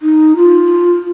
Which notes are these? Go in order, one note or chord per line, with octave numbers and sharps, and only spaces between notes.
D#4
F4